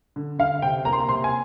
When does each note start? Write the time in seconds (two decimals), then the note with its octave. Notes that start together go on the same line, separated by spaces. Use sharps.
0.16 D3
0.39 D3 F5
0.62 C3 G5
0.85 A#3 A#5
0.93 C6
1.00 A#5
1.09 C3 C6
1.24 G#5